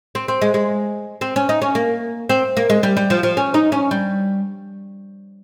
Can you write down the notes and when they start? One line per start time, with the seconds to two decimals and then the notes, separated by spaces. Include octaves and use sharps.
0.15 C4
0.28 C4
0.42 G#3
0.54 G#3
1.21 C4
1.36 C#4
1.49 D#4
1.62 C#4
1.75 A#3
2.29 C4
2.57 A#3
2.70 G#3
2.83 G3
2.97 G3
3.10 F3
3.23 F3
3.37 C#4
3.54 D#4
3.72 C#4
3.91 G3